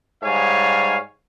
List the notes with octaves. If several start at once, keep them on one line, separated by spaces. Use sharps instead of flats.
G#2 G3 C#5 F5 G#5